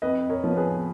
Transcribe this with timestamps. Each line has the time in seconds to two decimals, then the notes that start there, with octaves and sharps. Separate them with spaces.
0.02 F2 B4 D#5
0.29 A#4 C#5
0.44 F3 B3
0.57 G#4 B4